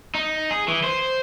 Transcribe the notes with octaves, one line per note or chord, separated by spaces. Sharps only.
D#4
G#4
E3
C5